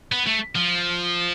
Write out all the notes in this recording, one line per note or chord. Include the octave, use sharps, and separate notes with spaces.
B3
A3
F3